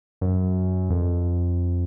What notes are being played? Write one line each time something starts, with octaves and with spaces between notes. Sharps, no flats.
F#2
F2